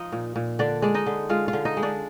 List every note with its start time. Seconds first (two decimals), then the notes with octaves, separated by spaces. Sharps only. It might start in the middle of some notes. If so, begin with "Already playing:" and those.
Already playing: F3 D#4 D#5
0.12 A#2
0.36 A#2
0.59 D3 D4 D5
0.82 G#3 D5
0.94 D#4 D#5
1.06 D3
1.29 G#3 F4 F5
1.48 F4 F5
1.53 D3
1.65 D#4 D#5
1.77 G#3
1.83 D4 D5